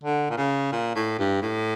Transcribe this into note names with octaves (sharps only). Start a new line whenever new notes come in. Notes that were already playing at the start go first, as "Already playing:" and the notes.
D3
A#2
C#3
A#2
A2
G2
A2